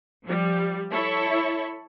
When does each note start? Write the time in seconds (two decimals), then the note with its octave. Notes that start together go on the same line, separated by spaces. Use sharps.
0.25 F3 G3
0.91 E4 A4 C#5 E5 B5 C#6